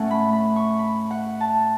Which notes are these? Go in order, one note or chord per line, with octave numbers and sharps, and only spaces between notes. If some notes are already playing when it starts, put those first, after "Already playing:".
Already playing: A2 A3 C#4 F#5
B5
B5
C#6
B5
F#5
A5